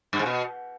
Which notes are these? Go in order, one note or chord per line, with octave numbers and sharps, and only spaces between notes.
G2
G#2
B2